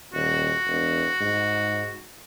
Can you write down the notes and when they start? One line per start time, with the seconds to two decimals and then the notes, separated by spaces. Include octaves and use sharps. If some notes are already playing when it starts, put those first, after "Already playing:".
0.14 D#1 F#4
0.66 E1
1.21 G#2